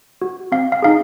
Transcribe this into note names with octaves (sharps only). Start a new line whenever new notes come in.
F#4
C4 F5
F5
D#4 G#4 F5